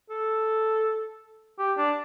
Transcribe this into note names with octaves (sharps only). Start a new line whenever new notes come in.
A4
G4
D4